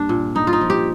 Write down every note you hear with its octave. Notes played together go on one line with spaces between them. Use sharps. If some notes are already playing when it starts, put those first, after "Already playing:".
Already playing: G2 A#3 D4
A#2
G2 D#4
F4
D#4
F3
G4